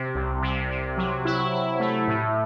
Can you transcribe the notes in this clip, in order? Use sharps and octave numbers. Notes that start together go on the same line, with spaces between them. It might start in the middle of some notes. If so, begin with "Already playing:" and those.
Already playing: C3
C2
C3
C3
F#3
E4
E4
A3
A2